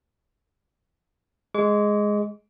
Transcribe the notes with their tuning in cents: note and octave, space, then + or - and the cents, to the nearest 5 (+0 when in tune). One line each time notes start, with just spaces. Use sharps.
G#3 +0 D6 -45